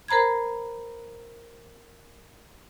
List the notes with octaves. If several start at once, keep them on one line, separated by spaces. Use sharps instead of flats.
A#4 C5 A#5 B5 G#6